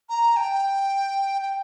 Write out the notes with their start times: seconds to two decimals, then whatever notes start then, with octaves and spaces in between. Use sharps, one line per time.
0.09 A#5
0.36 G5
1.42 G5